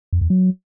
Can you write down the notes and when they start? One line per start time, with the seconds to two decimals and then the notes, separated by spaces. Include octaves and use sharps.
0.13 F2
0.21 E2
0.30 F#3